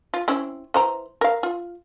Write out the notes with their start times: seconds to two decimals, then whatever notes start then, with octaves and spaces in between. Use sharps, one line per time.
0.14 F4
0.28 C4 C#4 E4
0.74 E3 C5 A#5
1.21 A#4 F5
1.43 F4